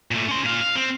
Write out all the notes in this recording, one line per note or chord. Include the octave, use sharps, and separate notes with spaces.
A#2 A3
C#4 C6
A#2 F5
F5
C4